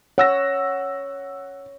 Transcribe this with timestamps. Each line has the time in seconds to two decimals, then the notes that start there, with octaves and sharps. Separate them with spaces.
0.18 C#5 F#5 E6 A#6